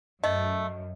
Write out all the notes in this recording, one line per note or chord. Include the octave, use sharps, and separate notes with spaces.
F#2 A3 D#5